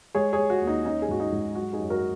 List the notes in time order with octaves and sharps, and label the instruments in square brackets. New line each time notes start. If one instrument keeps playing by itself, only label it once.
[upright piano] G#3 G#4 C#5
G#4 C#5
G#3
F#4
D#2
D#4
C#4 D#4
G#4
G#2 F#4
D#4
G#2
F#3 F#4
D#4 G#4
F#2
F#4 A#4